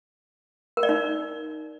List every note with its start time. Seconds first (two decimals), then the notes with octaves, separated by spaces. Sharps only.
0.77 A#4
0.83 D5
0.89 D#4